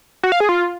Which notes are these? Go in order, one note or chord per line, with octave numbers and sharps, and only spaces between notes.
F#4
F5
G#4
F4